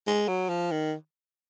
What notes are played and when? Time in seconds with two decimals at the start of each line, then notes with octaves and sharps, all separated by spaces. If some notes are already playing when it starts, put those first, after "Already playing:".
0.07 G#3
0.28 F#3
0.49 F3
0.71 D#3